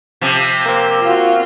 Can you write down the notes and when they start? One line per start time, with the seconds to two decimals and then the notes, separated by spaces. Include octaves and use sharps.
0.21 C3 F3
0.66 A#3 C4
1.01 F4 F#4